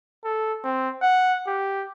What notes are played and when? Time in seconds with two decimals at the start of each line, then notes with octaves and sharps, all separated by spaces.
0.24 A4
0.64 C4
1.02 F#5
1.47 G4